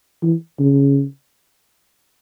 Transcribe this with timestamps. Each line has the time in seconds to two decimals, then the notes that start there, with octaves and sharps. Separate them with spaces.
0.23 E3
0.60 C#3